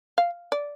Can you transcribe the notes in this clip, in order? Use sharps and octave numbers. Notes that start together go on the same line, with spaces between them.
F5
D5